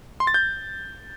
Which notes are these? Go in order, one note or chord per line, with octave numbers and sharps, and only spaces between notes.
C6
A6
G6